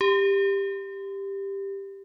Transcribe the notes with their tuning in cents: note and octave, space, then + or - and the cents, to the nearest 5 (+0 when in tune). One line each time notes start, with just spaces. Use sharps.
G4 +10